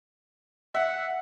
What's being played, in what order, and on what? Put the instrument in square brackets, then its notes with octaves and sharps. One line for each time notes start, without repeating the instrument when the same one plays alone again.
[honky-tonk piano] E5 [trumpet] F#5